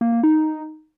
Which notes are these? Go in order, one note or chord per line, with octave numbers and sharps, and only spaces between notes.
A#3
A#3
D#4